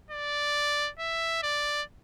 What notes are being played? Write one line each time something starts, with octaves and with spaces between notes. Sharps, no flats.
D5
E5
D5